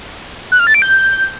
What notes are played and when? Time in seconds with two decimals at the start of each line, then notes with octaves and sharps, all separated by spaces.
0.52 F#6
0.59 F6
0.67 A6
0.74 D7
0.82 G6